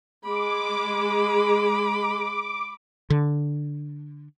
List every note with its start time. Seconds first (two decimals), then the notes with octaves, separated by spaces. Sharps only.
0.24 G#3 B5 D6
3.10 D3